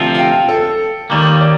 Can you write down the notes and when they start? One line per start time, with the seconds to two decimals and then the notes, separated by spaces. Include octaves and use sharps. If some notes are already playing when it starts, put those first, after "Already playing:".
Already playing: D2 C3 F3 C4 F4
0.14 F5
0.19 G5
0.48 A4
1.10 D#2 D#3 G3 A#3
1.41 D5